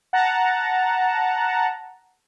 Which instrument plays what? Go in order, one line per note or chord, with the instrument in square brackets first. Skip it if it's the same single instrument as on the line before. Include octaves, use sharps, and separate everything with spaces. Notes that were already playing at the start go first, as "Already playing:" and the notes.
[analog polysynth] F#5 A5 A#5